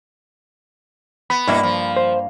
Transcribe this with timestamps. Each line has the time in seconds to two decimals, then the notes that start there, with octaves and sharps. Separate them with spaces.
1.30 B3 B5
1.48 G2 B2 A#3 E4
1.63 F3
1.96 C5